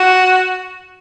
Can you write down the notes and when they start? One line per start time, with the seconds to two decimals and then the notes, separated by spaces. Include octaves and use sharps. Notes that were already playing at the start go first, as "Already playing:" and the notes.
Already playing: F#4